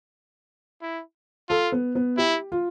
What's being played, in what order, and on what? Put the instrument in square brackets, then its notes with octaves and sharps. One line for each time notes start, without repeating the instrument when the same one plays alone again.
[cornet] E4
[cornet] F4 [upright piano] A4
[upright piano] B3
B3
[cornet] E4 [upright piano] G4
[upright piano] F4